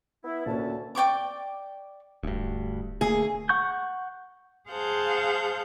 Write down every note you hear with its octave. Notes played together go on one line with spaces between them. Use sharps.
B3 E4
D2 A#2 A#3 C#4 A5
D5 G5 C#6 D6
D1 D2 G2
D3 A3 A#3 G#4
F#5 C#6 G6
G#4 C5 F5 F#5 A5 G6